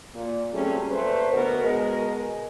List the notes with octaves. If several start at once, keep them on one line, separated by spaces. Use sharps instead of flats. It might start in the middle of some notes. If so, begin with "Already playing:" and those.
A#2
F#3 G3 A3 C4 C#4 G#4
A#2 A3 B4 C5
D2 B2 B3 A#4
B2 G#3 A#4